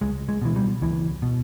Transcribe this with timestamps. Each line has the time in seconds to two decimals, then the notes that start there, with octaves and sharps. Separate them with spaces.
0.01 C#2 G#3
0.28 G#3
0.42 B2 E3
0.56 G3
0.81 C#2 E3
1.22 B2